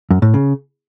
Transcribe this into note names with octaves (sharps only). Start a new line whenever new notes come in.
F#2
A2
C#3